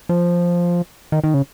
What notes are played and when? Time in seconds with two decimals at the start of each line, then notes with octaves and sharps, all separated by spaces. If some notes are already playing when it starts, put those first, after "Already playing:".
0.09 F3
1.12 D#3
1.24 D#3
1.34 C#3